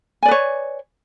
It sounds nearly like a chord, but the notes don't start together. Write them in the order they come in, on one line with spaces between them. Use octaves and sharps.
G#5 D5 B4 C#5